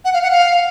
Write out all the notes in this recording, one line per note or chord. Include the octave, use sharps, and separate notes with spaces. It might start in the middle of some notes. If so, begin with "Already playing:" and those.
F#5
F5
F#5
F5